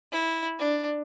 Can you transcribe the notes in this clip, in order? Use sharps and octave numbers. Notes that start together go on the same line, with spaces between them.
E4
D4